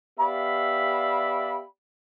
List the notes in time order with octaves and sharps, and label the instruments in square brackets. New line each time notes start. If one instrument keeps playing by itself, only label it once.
[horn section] B3 G4 D5 E5 F5 B5